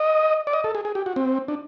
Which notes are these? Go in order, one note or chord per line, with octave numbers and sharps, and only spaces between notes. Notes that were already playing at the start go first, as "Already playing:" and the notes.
Already playing: D#5
D5
D#5
A4
G#4
G#4
G4
F#4
C4
D4